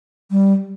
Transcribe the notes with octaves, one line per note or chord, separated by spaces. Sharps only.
G3